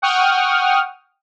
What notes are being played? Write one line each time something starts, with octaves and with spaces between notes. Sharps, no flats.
F#5 G5 C#6 D#6 F6